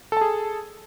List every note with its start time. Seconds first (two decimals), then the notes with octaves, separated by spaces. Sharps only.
0.12 A4
0.17 A5
0.21 G#4